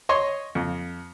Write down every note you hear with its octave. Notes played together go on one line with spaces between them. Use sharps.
C#5 D#5 C6 C#6
F2